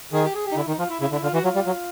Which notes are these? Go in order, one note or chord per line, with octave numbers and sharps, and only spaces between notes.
D#3 G#4
G4
G#4
G4
D#4
D3 E4
D#3 D#4
F3 F4
E4
C#3 E4
D3 E4
D3 F4
E3 F#4
F#3 F4
G3
F#3